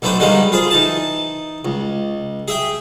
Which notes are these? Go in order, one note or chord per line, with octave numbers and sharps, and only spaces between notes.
B1 A3 B3 D4 C5
D3 D#3 G3 G#3 A#3 B3
F4 G#4 C5
E3 D#4 A5
C#2
G#4 E5 G5